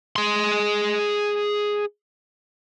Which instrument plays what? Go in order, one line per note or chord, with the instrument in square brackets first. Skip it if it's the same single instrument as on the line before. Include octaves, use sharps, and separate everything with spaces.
[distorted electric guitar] G#4 C6